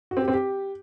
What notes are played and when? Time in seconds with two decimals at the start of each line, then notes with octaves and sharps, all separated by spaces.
0.11 F#4
0.17 C4
0.22 G4
0.28 C4
0.33 G4